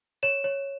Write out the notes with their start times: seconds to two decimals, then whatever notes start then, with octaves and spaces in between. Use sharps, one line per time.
0.23 C#5 E7
0.44 C#5